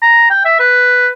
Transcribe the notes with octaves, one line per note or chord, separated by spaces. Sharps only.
A#5
G5
E5
B4